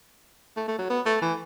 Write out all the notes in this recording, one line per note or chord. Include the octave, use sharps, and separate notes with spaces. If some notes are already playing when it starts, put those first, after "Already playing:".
A3
A3
F#3
B3
A3
E3